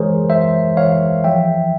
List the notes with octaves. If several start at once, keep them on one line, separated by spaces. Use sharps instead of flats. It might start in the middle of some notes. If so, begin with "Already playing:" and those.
Already playing: E3 G#3 G#4 A#4 C5 C#5
E3 C5 E5
E3 C#5 F5
F3 E5 G5